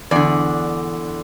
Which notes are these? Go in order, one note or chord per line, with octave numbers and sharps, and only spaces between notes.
E2 D3 D5